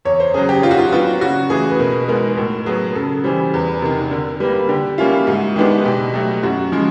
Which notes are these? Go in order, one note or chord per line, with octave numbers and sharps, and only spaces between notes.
E2 C#5
C5
C#3 F#3 G#4
G4
D#3 F4
F#4
F4
F#3 B3 D4 F4 F#4
C#3 F#4
E3 A3 G#4
B4
B2 A#4
G#3 B3 D#4 A#4
A2 A#4
F#3 B3 G#4
C#3 A4
E3 G3 C5
E2 B4
C3 D#3 A#4
D3 A#4
G3 A#3 B4
D3 G4
G3 A#3 C#4 E4 F4
G#2 F#4
D#3 G#3 B3 D4 G4
G#4
B2 G4
F#3 A3 G4
F#2 F#4
C#3 F3 G#3